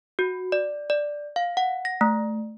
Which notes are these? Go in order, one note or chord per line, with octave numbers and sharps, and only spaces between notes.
F#4
D5
D5
F5
F#5
A#6
A3